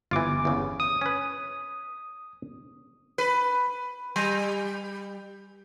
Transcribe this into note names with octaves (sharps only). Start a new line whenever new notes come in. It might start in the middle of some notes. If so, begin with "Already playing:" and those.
G1 E3 F4 D6
E2 C#3
D#6
C#4 B4
B4
G3